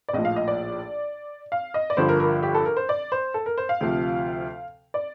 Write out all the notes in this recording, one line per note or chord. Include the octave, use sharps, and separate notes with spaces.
D5
A#1 A2 F3 D#5
F5
D#5
D5
F5
D#5
D5
G1 G2 D3 F3 C5
A#4
A#4
G4
A4
A#4
C5
D5
C5
A4
A#4
C5
F5
D2 C3 F3
D5